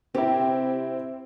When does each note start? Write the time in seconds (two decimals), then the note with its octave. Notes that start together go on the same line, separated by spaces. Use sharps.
0.15 C3 C4 E4 G4